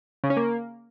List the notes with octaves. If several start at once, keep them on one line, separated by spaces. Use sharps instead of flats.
C#3
C#4
A#3